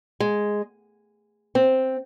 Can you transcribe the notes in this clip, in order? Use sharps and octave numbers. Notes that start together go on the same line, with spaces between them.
G#3
C4